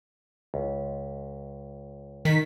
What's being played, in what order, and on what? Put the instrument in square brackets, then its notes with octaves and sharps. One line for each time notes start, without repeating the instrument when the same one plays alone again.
[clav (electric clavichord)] C#2
[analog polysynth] D#3 B6